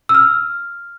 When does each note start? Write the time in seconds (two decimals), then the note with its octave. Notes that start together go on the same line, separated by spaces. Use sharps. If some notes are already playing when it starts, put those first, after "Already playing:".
0.09 E6
0.15 F6